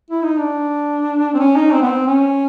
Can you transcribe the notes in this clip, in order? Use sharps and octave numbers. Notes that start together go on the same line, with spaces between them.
E4
D#4
D4
C4
C#4
D#4
C4
B3
C4
C#4